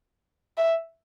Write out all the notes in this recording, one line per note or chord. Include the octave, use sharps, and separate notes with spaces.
E5